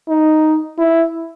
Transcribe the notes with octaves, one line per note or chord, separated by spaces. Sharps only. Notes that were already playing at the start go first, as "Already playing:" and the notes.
D#4
E4